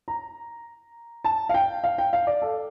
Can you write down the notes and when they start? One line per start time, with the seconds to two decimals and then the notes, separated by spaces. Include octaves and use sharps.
0.08 A#5
1.25 A5
1.49 F5
1.54 G5
1.84 F5
1.98 G5
2.13 F5
2.27 D5
2.42 A4